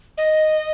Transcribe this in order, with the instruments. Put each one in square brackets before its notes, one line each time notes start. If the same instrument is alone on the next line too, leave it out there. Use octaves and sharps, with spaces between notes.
[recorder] D#5